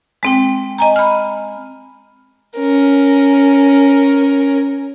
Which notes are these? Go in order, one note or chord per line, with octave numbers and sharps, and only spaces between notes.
G#3 C4 G5
D#5 G#5 A#5
B5 F6
C#4 A#4